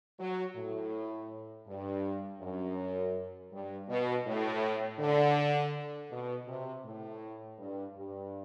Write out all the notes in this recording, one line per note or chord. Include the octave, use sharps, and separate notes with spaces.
F#3
A2
G2
F#2
G2
B2
A2
D3
B2
C3
A2
G2
G2